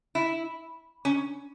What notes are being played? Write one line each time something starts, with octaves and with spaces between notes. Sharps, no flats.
E4
C#4